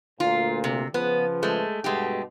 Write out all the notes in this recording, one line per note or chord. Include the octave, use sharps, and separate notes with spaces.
D2 A#2 F4
C3
C#3 F3 B3 B4
G#3 A3
G2 B2 G#3 A3 G4